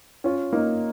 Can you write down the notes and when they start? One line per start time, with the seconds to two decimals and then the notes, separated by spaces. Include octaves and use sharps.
0.24 C#4 F4
0.53 A#3 D#4